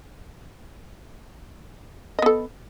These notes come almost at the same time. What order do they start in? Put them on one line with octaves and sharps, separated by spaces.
D#5 B3 A4